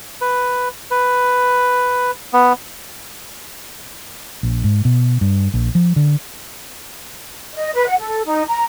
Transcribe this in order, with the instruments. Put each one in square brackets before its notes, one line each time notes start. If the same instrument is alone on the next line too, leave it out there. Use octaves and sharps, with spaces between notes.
[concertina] B4
B4
B3
[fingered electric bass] A#1
G#2
B2
G2
A#1
F3
D3
[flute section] D#5
B4
F#5
A4
D#4
A#5